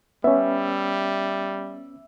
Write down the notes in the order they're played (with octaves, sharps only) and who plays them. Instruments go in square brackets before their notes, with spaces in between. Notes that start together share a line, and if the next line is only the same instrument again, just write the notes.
[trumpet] G3 [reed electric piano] B3 C#4 [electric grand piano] E5